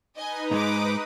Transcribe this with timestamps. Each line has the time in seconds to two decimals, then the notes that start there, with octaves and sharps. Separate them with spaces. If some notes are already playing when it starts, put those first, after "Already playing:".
0.16 D#4 B4 D#5 G#5 D#6
0.51 G#2 G#3 A#5 D6